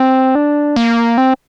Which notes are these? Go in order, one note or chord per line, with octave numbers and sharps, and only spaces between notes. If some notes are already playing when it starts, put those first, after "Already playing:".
Already playing: C4
D4
A#3
C4